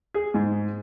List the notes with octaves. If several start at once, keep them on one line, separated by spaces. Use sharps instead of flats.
G#4
G#2